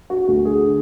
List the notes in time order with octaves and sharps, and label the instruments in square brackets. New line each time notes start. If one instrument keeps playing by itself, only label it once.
[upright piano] F#4
D2 F#4
G#4
D3